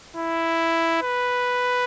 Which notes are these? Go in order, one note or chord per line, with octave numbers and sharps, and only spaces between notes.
E4
B4